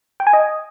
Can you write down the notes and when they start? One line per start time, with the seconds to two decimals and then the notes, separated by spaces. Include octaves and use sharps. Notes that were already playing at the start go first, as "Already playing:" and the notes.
0.20 G5
0.27 G#5
0.33 D#5